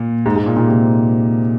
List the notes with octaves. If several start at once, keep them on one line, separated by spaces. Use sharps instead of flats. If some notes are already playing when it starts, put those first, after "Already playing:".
Already playing: A#2
G#2
G#2
A#2
A#2
C3